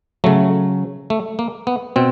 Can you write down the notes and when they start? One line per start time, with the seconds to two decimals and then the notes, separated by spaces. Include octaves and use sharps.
0.24 C#3 F#3 A3
1.10 A3
1.39 A#3
1.67 B3
1.96 B2 C4